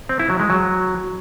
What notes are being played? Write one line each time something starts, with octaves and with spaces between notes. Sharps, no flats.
C4
E4
F#3
G#3
F#3